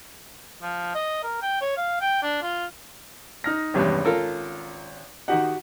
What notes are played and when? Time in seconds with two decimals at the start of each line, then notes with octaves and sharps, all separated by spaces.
0.62 F3
0.95 D#5
1.23 A#4
1.42 G5
1.61 C#5
1.77 F5
2.01 G5
2.23 D4
2.42 F4
3.44 D#4 F6 A#6
3.74 G#1 E2 G2 C3 C#4
4.05 F4 A4 A#4
5.28 D#3 D#4 F#4 G4 F#5